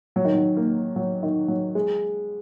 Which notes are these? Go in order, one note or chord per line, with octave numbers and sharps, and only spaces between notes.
F#3
D#3
F#3
A#3
F#3
D#3
F#3
G#3